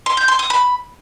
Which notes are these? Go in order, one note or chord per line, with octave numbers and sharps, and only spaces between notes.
C6
G6
C6
D#6
B5